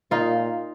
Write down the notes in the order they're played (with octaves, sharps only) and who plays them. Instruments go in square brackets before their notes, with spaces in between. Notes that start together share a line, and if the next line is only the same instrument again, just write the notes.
[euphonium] A#2 [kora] D#4 F4